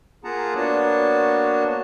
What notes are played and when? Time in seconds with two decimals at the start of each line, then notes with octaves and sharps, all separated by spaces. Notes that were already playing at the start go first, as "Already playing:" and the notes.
0.24 A#3 F4 G#4 F#5 A5 A#5
0.56 A#3 B3 D4 F#4 C#5 A5